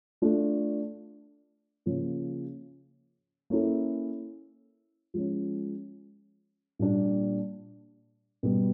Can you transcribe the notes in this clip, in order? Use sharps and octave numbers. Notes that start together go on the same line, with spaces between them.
A3 D4 F4 A4
C#3 F3 A#3 C#4
A#3 C#4 E4 A4
F3 G#3 C#4
A#2 G3 A#3 D4
B2 G3 B3